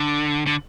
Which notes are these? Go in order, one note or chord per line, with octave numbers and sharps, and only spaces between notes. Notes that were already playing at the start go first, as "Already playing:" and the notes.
Already playing: D3
D3